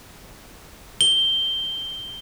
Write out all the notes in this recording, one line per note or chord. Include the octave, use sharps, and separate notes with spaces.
G7